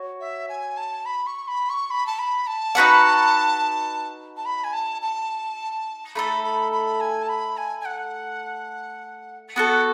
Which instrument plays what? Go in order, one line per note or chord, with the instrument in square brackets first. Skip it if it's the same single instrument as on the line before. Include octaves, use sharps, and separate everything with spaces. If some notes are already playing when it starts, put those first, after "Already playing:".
Already playing: [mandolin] F#4 C#5
[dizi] E5
G#5
A5
B5
C#6
B5
C#6
B5
A5
B5
A5
[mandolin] D#4 F#4 B4 F#5
[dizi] A5
B5
G#5
A5
A5
[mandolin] A3 D#4 A4 [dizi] B5
[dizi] B5
B5
G#5
A5
B5
G#5
G#5
F#5
[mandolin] B3 F#4 A4 [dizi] F#5